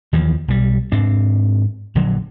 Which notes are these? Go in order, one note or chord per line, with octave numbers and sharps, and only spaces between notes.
D#2 E3 F3
B1 G3
G#2 C4 D4
A#1 D3 F#3